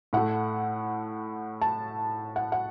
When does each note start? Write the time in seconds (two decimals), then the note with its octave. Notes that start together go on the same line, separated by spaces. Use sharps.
0.13 A2 A3 F#5
1.62 A5
2.36 F#5
2.52 F#5